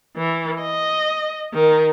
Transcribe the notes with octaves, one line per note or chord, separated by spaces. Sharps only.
E3
D#5
D#3